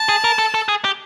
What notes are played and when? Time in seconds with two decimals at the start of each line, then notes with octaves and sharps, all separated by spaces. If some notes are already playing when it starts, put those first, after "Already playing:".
Already playing: A5
0.09 G#4
0.24 A#4
0.39 A4
0.54 A4
0.69 G#4
0.85 G4